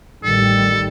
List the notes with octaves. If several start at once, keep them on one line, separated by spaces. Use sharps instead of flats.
A1 D#3 G3 A4